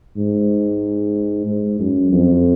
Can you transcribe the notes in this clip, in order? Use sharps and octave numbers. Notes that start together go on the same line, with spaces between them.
G#2
G#2
F#2
F2